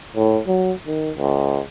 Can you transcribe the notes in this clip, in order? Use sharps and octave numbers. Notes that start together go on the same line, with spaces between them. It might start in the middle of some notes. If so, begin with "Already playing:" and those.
A2
F#3
D#3
C#2